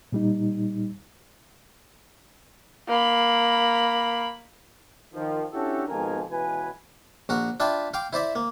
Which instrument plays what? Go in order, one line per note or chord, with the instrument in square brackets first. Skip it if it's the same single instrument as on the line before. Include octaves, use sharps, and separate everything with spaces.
[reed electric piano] A#2 G3 D#4
[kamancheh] A#3 B5
[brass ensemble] D#3 F3
C#4 D4 E4 F#4 G4 A4
F2 G#2 B2 D#3 A#4 G#5
C#2 B2 E3 B4 G#5
[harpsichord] A#1 F#4 A#4
D4 F4 E5 G5 B5
F5 G5 C6 D6
E4 C5 D5 E5
A#3